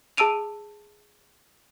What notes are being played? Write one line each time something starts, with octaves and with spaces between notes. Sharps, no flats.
G#4 A5 E6 D7 D#7 F7